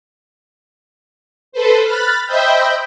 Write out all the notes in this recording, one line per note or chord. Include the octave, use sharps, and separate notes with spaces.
A4 B4 C5
B5 F6 F#6 A6
C5 D#5 E5 G5 B5 G6